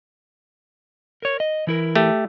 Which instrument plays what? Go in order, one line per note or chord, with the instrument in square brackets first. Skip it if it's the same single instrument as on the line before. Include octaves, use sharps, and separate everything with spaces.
[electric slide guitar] A#4 C#5
D#5
E3 E4 A#4
[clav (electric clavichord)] A3 G4